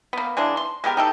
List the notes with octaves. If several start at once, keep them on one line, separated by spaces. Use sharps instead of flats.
A#3 B3
E3 G#3 A#3 D4
C6
G#3 B3 G4 A#4
D#4 G4 A4